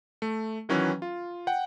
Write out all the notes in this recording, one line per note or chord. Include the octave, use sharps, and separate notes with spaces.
A3
D#3 E3 F#3 C#4 B4
F4
F#5 G5